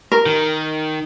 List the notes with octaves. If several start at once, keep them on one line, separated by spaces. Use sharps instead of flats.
A#4
D#3